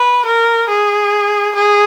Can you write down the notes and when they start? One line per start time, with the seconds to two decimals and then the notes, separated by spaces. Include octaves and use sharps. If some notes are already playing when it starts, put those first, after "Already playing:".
Already playing: B4
0.25 A#4
0.69 G#4
1.55 G#4